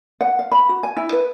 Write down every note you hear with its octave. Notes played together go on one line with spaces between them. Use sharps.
F#5
F5
B5
F#4
G#5
E4
B4